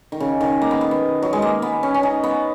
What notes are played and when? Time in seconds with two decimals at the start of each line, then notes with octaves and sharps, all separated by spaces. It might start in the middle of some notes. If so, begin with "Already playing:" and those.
0.12 D#3
0.20 C#3
0.41 D#3
0.62 A#3
0.71 B3
0.81 B3
0.91 B3
1.22 F#3
1.33 G#3
1.42 A#3
1.62 B3
1.83 C#4
1.94 C#4
2.03 D#4
2.23 B3